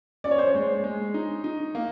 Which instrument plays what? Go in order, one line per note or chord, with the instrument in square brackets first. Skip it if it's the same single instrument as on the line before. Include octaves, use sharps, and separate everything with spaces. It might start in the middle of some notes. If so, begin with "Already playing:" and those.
[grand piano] C#4 [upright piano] D5
[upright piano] C#5
C5
C#5
[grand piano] G#3
G#3
D#4
D#4
A#3